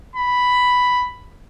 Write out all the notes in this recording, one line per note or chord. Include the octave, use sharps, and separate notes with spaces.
B5